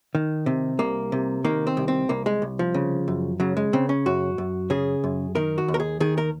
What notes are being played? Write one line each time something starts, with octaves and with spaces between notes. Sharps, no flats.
D#3
C3
C2 A#3
C3
D#3 A#3
C4
C2
C4
C2 A#3
G#3
C2
F3
C#3
F#2
C#3 F#3
G#3
C#3 C4
C#4
F#2 F#4
F#2
C#3 G#4
F#2
D#3 A#4
F#4
D#2
A#4
G#4
D#3 G#4
A#4